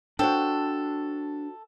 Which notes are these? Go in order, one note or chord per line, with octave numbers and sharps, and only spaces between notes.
D4 F#4 A4 C5 G5